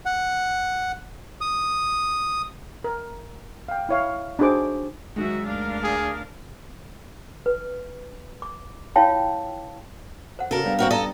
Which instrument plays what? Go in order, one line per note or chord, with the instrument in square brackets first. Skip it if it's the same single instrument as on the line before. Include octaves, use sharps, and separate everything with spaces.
[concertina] F#5
D#6
[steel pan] A#4
F5 G5
E4 C#5 F5
D4 D#4 F#4 G#4 C5 D6
[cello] D#3 F#3 [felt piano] G#3 D#4 [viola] F#4 E5
[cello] D2 A#4 [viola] D4 F5
[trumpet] G#4
[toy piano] B4
D6
E4 F4 C#5 F5 G5 A5
C5 F#5
[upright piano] C#3 [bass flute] F#4 [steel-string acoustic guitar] A4 A#4
[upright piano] G3 B3 D4 [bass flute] F5
[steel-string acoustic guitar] C4 F#4 A#4
[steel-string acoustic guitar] A4 D#5 [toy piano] D5 A#5